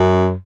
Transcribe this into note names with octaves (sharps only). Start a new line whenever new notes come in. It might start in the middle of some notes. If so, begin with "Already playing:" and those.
Already playing: F#2